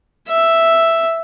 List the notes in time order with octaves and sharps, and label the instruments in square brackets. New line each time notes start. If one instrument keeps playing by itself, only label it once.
[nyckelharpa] E5